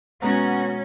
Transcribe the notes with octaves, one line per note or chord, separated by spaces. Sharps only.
B2 G#3 B3 C#4 F#4 A#5